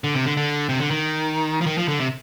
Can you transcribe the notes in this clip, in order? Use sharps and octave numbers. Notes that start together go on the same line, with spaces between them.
D3
C3
D3
D3
C3
D3
D#3
F3
D#3
F3
D3
C3